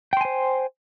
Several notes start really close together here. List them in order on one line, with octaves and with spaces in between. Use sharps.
G5 C6 G#5 C5